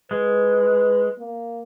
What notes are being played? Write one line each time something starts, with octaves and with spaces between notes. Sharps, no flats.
G#3 B4
A#3